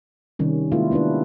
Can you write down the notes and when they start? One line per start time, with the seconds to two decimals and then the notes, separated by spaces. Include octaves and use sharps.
0.39 C3 D#3 G3 C#4
0.72 G#3 A#3 E4 F4
0.91 B3 D4 E4 B4